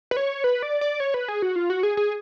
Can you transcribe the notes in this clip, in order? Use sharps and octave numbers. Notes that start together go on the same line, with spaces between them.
B4
C#5
B4
D5
D5
C#5
B4
G#4
F#4
F4
F#4
G#4
G#4